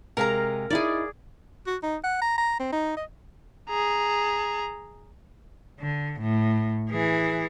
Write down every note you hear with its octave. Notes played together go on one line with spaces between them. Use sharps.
C3 G#3 A#4 F5 A#5
D#4 E4 G#4 D5
F#4
D#4
F#5
A#5
A#5
C4
D#4
D#5
G#4 A#5
D3
A2
E3 G#4